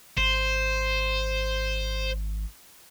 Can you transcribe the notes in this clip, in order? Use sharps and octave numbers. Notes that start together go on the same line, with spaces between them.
G#1 C5